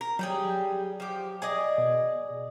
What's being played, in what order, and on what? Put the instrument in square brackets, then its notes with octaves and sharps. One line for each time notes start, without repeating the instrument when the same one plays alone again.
[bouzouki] A#4
[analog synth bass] F#3 [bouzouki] G3 G4 G#4
[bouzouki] F3 G4
G#4 D5 D#5
[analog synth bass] B2